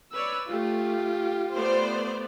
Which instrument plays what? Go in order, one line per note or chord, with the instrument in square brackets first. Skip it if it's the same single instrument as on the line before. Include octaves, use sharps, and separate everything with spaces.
[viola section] B4 C#5 D5 [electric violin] E6
[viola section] A3 [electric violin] F4 G4
[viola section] A3 B3 D5 [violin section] C5